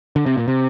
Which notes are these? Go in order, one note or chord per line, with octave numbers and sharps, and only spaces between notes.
D3
C3
A#2
C3